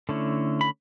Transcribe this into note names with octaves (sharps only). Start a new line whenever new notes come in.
D3 A3 C#4 E4
B5